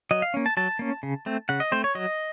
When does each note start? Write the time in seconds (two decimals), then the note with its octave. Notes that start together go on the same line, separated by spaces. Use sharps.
0.11 F#3 D#5
0.22 F5
0.34 A#3 C#4
0.46 A5
0.57 F#3 A5
0.79 A#3 C#4
1.03 C#3
1.26 A3 C4
1.49 C#3 F#5
1.60 D#5
1.72 A3 C4 C5
1.84 C#5
1.95 F#3 D#5